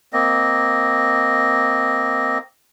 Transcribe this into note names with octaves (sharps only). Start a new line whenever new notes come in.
A#3 C4 D#5